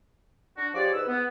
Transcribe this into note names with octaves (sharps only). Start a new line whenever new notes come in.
D4 F#4
F3 G4 G#4 C#5 D5
G#2 B4 E6
B3